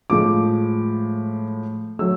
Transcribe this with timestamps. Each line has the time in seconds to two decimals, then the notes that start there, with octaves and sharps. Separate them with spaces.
0.10 A2 F3 G#3 D6
1.99 F#3 A3 E6